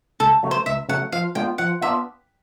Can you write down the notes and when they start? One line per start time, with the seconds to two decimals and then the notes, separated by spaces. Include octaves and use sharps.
0.20 C#2 A4
0.43 C#3 F#3 A3
0.51 C5
0.66 C#2 E5
0.89 C#3 F#3 A3 F#5
1.12 F3 F5
1.35 G#3 B3 D4 F4 G5
1.58 F3 F#5
1.81 B3 D4 F4 E5